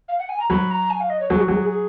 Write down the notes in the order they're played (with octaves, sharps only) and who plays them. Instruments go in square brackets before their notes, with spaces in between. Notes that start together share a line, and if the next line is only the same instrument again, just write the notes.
[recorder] F5
F#5
G#5
A#5
[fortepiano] F#3 [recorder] B5
[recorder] A#5
G#5
F5
D#5
C#5
[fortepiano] F#3 [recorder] G#4
[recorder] F#4
[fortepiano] F#3 [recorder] G#4
[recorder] G#4
G#4